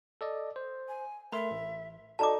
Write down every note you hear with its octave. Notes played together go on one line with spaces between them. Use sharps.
A4 D5 D#5
C5
G#5
A3 A#4 E5 B5 C6
A1
D#4 F#4 A4 D5 D#5 A5 A#5 D6